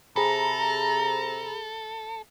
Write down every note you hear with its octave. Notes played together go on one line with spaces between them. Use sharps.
C3 G#4 A4 A#5 B5